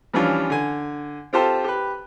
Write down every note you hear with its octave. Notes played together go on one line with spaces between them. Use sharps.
E3 F3 G3 C#4 D4 F4
D3 G#5
C4 F4 G4 A4 C5 A5
G4 B4